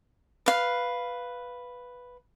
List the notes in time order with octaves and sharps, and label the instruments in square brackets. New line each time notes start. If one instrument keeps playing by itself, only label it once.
[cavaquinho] B4 F5